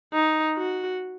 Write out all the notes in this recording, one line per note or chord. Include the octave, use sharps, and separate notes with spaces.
D#4
F#4